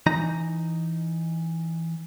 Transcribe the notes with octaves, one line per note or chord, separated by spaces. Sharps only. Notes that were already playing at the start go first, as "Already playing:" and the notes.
E3 D#4 A#5